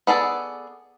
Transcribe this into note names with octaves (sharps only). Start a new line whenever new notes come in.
B3 G#4 A4 D5